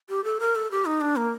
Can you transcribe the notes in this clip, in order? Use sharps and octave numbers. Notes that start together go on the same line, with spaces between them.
G4
A4
A#4
A4
G4
D#4
D4
A#3